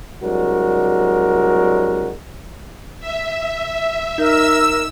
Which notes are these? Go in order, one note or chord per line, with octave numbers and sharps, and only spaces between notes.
C2 F#3 G#3 D4 F#4 A#4
E5
D#4 A#4 E6